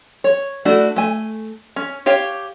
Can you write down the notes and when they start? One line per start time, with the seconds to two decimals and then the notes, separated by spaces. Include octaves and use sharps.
0.24 C#5
0.65 A3 D4 E4 F#4
0.96 A3 G#5
1.76 C#4
2.06 G4 C#5 F5